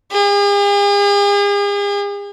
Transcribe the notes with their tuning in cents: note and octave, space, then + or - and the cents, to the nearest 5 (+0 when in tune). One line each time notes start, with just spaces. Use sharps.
G#4 -45